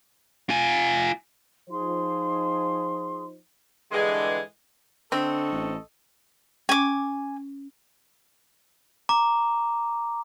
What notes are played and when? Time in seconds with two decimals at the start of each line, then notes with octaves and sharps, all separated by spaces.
0.50 F4 G#5
1.70 F3 D#4 G#4 C5 C6
3.92 G2 D3 E3 G#3
5.12 D3 C4 D4 A4 D#5 C#6
5.52 A1
6.69 C#4 G#5 D6
9.09 A#5 D6